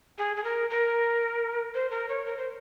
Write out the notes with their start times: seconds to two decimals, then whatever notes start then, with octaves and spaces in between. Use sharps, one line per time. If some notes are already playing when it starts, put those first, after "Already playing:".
0.18 G#4
0.37 G#4
0.44 A#4
0.70 A#4
1.74 C5
1.91 A#4
2.09 C#5
2.26 A#4
2.37 C5